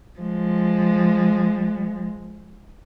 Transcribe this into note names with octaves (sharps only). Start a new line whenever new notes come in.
F3 G#3